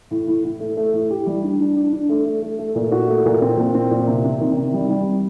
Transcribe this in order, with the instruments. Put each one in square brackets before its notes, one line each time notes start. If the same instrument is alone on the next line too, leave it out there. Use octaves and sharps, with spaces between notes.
[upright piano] A2
A2
A2
A3
A3
A2
G4
G3
D4
D4
D4
D4
A3
A3
A3
A3
A#2
F#4
A3
A#2
C4
A#2
C4
A#2
C3
C3
D#3
C3
G3
G3